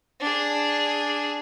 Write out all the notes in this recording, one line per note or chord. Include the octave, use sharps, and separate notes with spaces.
D4 G#4